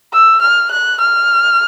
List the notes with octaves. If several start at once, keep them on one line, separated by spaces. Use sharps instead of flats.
E6
F6
F#6
F6